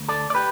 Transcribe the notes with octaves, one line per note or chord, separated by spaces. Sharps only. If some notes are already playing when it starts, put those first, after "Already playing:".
Already playing: D2
A4 D5
D5
G4 B4